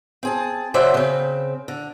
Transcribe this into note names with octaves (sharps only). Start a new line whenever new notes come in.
C4 G#4 A5
C#3 F#3 C5 D5 E5 F#5
C#3 C4
D3